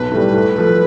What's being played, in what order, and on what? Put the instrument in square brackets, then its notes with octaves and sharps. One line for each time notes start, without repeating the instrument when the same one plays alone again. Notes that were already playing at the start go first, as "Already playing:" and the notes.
Already playing: [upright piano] B1 [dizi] B4
[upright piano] A2 G3
A2
F3 A3